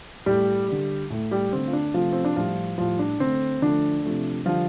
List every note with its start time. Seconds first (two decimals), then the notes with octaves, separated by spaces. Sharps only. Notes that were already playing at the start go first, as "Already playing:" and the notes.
0.26 A2 G3 A3 G4
0.68 D3 G3
1.10 A2 A3
1.31 G3 G4
1.52 D3 A3 C4
1.68 F4
1.73 D4
1.94 C3 F3 A3 F4
2.13 C4
2.25 D4
2.36 A2 F3 G3 F4
2.78 A2 F3 G3 F4
2.99 D4
3.20 D3 A3 C4
3.62 D3 F3 A3 D4
4.03 C3 F3 A3
4.45 D3 F3 G3 F4